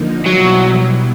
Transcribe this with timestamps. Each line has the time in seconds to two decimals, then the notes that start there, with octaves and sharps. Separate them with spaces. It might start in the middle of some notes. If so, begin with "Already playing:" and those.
Already playing: D3 F3 A#3 D#4
0.26 B2 F#3 G3 B3 E4